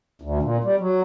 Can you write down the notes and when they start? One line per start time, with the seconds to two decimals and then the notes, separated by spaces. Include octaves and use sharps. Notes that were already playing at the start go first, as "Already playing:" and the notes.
0.22 D2
0.42 A#2
0.64 G3
0.79 F#3